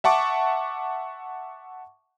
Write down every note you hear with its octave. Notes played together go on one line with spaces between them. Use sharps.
E5 F#5 A5 C#6 D6